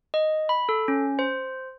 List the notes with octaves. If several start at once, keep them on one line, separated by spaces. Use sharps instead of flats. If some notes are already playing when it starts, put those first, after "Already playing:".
D#5
B5
A4
C#4
C5